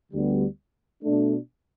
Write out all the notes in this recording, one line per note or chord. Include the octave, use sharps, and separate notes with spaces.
D2 D3 G3 B3
B2 A3 D4